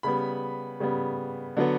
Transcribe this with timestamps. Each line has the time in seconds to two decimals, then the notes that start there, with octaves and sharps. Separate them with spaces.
0.03 C#3 G3 B3 B5
0.80 C#3 G3 B3
1.57 D3 F#3 B3